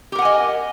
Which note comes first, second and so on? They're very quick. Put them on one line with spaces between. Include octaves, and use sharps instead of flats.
G4 A#4 F#5 G#5 D#5